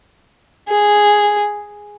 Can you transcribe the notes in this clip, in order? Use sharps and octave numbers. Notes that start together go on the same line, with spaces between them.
G#4